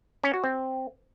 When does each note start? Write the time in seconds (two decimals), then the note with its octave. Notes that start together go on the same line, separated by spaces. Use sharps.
0.24 C#4
0.34 F#4
0.44 C4